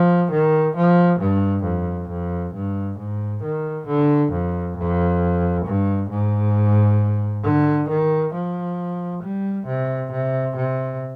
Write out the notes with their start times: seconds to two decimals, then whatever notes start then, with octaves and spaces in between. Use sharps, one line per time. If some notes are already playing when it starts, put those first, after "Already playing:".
Already playing: F3
0.31 D#3
0.76 F3
1.19 G2
1.64 F2
2.09 F2
2.54 G2
2.98 G#2
3.43 D#3
3.87 D3
4.32 F2
4.77 F2
5.66 G2
6.10 G#2
7.44 D3
7.89 D#3
8.33 F3
9.23 G3
9.67 C3
10.11 C3
10.56 C3